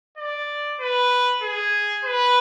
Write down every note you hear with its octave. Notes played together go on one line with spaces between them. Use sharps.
D5
B4
G#4
B4